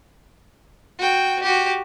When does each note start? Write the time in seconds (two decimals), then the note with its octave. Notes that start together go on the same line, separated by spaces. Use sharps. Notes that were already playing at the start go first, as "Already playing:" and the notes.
0.99 F#4 G5
1.42 F#4 G4